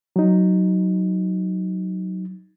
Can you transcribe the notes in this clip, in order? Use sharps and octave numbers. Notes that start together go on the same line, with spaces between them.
F#3 D#4